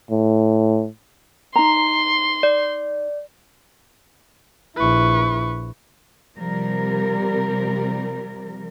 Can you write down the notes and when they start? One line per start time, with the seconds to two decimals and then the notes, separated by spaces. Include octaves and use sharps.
0.11 A2
1.56 D#4 A#5 C6
2.43 D5
4.76 A#1 E4 B4 C#6
6.37 C3 F3 G3 A#4